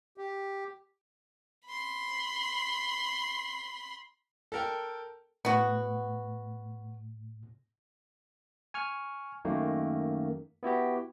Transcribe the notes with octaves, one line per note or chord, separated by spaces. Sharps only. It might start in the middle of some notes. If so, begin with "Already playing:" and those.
G4
B5 C6
A4 A#4 G5
A2 B3 F#4
G#5 C#6 F6
F#2 D#3 A3 A#3
B3 E4 F#4 G4